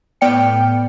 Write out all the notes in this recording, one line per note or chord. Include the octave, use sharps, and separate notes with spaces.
A2 B3 D5 G5 F6 C#7